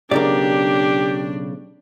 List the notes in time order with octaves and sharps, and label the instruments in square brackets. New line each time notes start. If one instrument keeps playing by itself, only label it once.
[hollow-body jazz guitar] B1 A#2 D5 [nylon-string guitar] C#3 A#4 [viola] D4 [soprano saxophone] G4